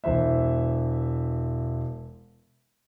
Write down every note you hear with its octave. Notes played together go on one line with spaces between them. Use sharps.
E1 E3 C5 E5